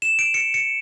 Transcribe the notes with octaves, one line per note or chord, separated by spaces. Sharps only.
E7
D7
C#7
C#7